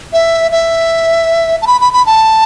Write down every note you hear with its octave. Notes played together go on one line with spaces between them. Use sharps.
E5
E5
A5
B5
B5
B5
A5